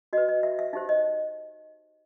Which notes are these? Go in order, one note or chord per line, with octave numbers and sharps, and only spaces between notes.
F#4 B4 D#5
D#5
E5
E5
D#4 G4 C5 E5
D#5